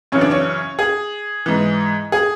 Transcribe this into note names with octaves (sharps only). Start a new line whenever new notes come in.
F#2 C#3 E3 C#4
D4
C#4
G#4
G#2 E3
G#4